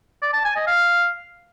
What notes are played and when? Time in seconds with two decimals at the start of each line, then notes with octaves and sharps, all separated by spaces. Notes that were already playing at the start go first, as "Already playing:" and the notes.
0.22 D5
0.33 A5
0.45 G#5
0.56 D#5
0.67 F5